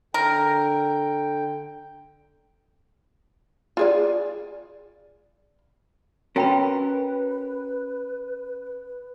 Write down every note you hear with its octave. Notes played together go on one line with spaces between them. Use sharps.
D3 A#4 G5
F4 G#4 D5
C#4 F#4 A#4 B4 G5 B5